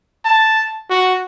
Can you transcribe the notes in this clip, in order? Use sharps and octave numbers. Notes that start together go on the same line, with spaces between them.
A5
F#4